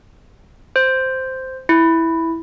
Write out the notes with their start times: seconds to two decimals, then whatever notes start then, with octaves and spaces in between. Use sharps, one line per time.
0.76 C5
1.69 E4